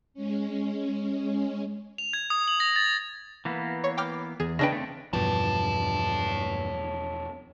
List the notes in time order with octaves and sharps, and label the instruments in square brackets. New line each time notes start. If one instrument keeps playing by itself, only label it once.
[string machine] G#3 C#4
[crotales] F7
G#6
D#6
F#7
A#6
A6
[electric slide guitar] E3 A#3 B3
[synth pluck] C#5
G5 D6 F6
[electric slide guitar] E2 [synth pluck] G#4
[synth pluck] C#3 D4 B4 [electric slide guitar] D#5 G5
[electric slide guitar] A3 C4
[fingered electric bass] E2 B2 F3 [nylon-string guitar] G2 [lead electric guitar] C#5 A5